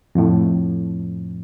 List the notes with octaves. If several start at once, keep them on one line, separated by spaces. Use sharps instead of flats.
F2 A2